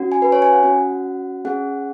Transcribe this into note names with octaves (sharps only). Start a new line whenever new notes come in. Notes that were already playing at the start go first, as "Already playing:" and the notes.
Already playing: C#4 F#4
G#5
B4
C#5
G#5
F#5
C#4 F#4
C#4 G#4 F#5